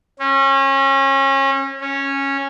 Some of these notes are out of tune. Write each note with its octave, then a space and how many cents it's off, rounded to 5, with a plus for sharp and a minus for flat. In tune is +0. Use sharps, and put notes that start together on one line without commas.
C#4 -30
C#4 -10